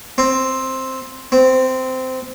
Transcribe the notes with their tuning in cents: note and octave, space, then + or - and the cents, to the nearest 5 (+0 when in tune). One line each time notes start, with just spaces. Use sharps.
C4 +5
C4 -15